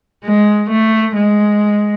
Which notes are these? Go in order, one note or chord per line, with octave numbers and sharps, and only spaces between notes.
G#3
A3
G#3